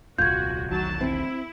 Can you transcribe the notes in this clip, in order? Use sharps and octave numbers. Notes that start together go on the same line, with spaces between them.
D#1 C2 F4 F#4 G6 G#6
E1 B1 D#3 F#3 A5
C4 E4